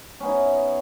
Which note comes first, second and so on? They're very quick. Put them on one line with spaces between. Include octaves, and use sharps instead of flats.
C#4 B3 D#4 E4